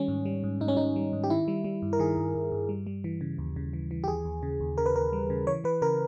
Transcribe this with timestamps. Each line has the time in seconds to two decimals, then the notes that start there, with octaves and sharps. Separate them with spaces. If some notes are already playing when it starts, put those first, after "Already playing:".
Already playing: D#3 G3 C#4
0.08 G#2
0.25 G3
0.44 G#2
0.61 G#2 D#4
0.68 C#4
0.77 G#2 D#4
0.96 G3
1.13 G#2
1.24 G4
1.30 D#3 E4
1.48 G3
1.64 G3
1.82 G2
1.93 A#4
1.99 D#3 G#4
2.17 G2
2.35 G2
2.52 G2
2.69 G3
2.87 G3
3.04 E3
3.21 C#3
3.38 D#2
3.56 C#3
3.73 E3
3.91 E3
4.04 G4
4.08 D#2 G#4
4.25 D#2
4.43 C#3
4.60 D#2
4.78 C#3 A#4
4.86 B4
4.95 D#2 A#4
5.13 G3
5.30 C#3
5.47 E3 C#5
5.64 E3 B4
5.82 C#3 A#4